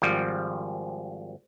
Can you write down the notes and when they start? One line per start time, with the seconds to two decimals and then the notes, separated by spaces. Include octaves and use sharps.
0.02 G#1 F3 G3